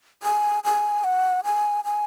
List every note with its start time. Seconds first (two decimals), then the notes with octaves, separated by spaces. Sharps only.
0.23 G#5
0.64 G#5
1.04 F#5
1.44 G#5
1.85 G#5